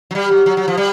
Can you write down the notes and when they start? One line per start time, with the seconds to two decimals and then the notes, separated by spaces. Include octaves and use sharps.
0.11 F#3
0.15 G3
0.31 F#3
0.46 F#3
0.57 F#3
0.68 F3
0.77 G3